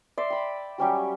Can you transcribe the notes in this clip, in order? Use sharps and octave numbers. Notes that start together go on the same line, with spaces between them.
D5 E5 C6
G5 B5
F#3 G3 C#4 G4